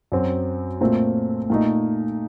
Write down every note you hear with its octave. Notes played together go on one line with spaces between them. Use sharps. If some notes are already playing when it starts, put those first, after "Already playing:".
F#2 F#3 C4
A#2 A3 C4
A#2 A3 D#4